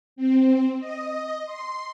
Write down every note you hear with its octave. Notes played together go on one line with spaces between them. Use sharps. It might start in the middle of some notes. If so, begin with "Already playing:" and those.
C4
D#5
C6